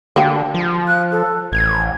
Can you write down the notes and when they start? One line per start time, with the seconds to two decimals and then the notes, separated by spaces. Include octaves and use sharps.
0.16 D3 A#3 G4
0.54 F3
0.86 F#6
1.11 A4
1.52 A1 G#6